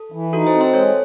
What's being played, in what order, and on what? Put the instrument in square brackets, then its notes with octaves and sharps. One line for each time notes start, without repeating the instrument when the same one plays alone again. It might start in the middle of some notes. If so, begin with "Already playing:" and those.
Already playing: [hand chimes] A4
[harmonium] E3
[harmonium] D#4 [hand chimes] F#4 A4
[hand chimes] C5 D#5
[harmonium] C4
[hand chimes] C5 D#5
[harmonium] G#3 [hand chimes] A4 C#5